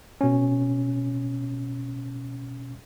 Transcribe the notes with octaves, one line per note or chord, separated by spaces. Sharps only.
B2 C#4